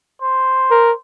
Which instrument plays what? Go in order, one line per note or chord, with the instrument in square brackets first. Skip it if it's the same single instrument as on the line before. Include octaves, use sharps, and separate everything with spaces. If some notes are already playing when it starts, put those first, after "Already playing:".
[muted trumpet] C5
[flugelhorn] A#4